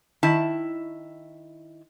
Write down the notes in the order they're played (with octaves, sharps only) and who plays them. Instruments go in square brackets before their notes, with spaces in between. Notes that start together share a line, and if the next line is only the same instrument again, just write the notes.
[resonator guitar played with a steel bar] D#3 E4 A5